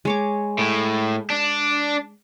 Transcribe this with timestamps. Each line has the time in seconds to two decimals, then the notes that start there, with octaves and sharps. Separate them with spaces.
0.05 G#3 C#5 D6
0.58 A2
1.30 D4